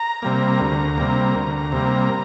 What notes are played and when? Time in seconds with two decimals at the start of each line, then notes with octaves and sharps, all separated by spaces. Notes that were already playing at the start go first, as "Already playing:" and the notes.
Already playing: A#5
0.22 C3 G3 A#3
0.60 D2
0.98 C3 G3 A#3
1.35 D2
1.72 C3 G3 A#3